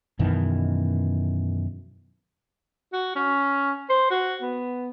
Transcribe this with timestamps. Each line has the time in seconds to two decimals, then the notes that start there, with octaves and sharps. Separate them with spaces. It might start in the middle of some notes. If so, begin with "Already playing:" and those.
0.19 F#2 B2 D#3 E3
2.93 F#4
3.16 C#4
3.90 C5
4.11 F#4
4.42 B3